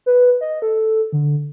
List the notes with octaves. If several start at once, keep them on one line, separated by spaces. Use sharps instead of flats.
B4
D#5
A4
D3